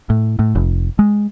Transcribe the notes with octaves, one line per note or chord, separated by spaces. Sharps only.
A2
A2
F1
G#3